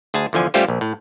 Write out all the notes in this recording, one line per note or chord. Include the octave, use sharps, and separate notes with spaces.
D2 G#4 G#5 A5
E2 D3 F3 G#5
G3 A3 C#4 F4 G4 C5
A#1
A2